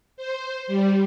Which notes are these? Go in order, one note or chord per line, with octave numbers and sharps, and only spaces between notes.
C5
G3